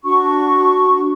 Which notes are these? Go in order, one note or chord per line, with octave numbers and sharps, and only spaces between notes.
D4 F#4 C#6